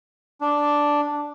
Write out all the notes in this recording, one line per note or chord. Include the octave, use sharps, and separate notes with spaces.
D4